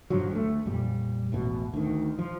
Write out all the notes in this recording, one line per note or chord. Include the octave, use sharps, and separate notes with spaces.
G2 D3 F3 F#3
D2 G#3 A3
F2 A#2 G3
E1 A1 B2
D2 D#3
F3